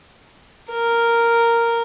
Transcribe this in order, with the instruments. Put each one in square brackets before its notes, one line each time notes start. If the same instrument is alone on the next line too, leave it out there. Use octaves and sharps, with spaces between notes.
[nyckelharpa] A#4